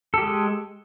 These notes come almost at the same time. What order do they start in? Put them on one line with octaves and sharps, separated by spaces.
A4 G4 G#3